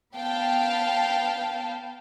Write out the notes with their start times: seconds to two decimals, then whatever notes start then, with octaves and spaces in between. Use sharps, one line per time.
0.15 B3 F5 G5 A5